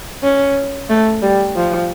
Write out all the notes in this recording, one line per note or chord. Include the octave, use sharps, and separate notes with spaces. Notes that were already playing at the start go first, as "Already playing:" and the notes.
C#4
A3
G3
F3